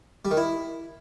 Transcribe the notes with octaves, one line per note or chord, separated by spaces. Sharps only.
G3
D#3
E4